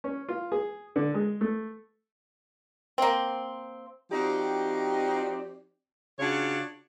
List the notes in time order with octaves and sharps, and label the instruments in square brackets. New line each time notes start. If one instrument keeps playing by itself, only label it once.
[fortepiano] C#4
F4
G#4
D3
G#3
A3
[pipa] A#3 C4
[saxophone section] F3 C4 D#4 F#4 G4 D5
C#3 D4 F4 F#4 C#5